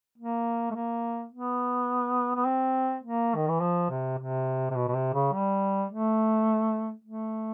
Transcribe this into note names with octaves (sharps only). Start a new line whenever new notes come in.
A#3
A3
A#3
B3
B3
C4
A#3
D#3
E3
F3
C3
C3
C3
B2
B2
C3
C#3
G3
A3
A3